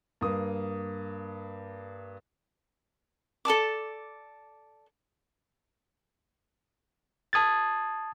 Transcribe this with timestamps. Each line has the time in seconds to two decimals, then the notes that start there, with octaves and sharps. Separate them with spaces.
0.21 G2 A#3 D#6
3.45 A4 D5 A5 D6
7.33 A5 D#6 G#6 A6